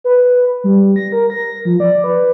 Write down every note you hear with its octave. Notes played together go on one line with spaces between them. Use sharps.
B4
G3
A#6
A#4
A#6
F3
D5
B4